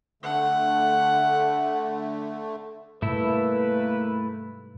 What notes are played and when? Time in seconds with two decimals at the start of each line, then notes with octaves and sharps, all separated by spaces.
0.23 D3 A3 F#5
3.02 G#2 C3 G3 A3 A#3 E4 B4